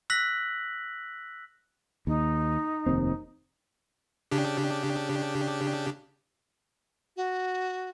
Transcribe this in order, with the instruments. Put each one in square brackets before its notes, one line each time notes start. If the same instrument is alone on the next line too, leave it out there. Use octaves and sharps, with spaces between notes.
[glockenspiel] E6 F#6 A#6 B6 F#7
[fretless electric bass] D#2 [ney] D#4
[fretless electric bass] F1 D#2 C4
[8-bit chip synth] C#3 D4 G4
[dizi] F#4